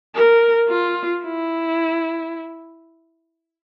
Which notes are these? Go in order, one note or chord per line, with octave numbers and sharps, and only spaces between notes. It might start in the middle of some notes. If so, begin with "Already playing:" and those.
A#4
F4
E4